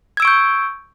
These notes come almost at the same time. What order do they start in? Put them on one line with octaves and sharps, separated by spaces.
G#6 E6 D7 C#6 G6